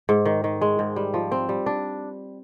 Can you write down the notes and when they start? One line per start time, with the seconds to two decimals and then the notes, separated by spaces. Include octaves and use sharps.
0.09 G#2
0.25 D#3
0.44 D#3
0.61 G#3
0.79 G#2
0.96 G3
1.14 F3
1.32 C4
1.49 G3
1.66 D4